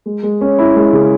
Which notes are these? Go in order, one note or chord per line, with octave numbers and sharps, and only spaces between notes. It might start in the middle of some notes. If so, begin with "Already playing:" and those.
G#3
G#3
C#4
E4
G#3
C#3